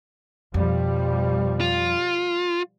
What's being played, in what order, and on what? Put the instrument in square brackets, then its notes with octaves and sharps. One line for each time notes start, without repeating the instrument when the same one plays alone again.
[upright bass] F2 [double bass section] B2 F3 G3
[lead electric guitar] F4